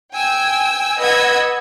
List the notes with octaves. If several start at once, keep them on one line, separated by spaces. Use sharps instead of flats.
G5 G#5 E6
B4 D#5 F#5 E6 G#6